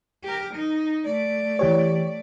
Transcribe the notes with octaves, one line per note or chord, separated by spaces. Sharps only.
G4 A#4
D#4
A3 D5
E3 G4 C#5